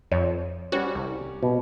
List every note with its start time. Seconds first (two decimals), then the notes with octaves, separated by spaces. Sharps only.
0.12 F2 C#5
0.72 G3 C#4 F#4 G4
0.95 C2
1.43 B2